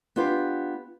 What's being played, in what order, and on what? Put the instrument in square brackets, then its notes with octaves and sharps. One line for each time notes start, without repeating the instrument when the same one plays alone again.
[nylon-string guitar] B3 D4 F4 G4 B4